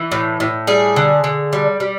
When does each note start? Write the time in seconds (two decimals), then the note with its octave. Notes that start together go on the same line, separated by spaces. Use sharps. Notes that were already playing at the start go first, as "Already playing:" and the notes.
Already playing: E3
0.12 A2
0.40 A2
0.67 G3 G#4
0.96 D3
1.24 D3
1.53 G3
1.80 G3